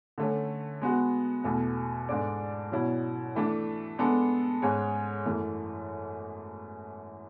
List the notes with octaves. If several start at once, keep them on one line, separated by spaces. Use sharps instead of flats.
D3 A3 C#4
G#3 B3 F#4
E2 B2 A3
G#2 G#3 D4 A4 D5
B2 F#3 C#4 E4
E3 A3 D4
G#3 B3 D4 A4
G#2 G#3 C#4 G#4 C#5
F#2 E3 A3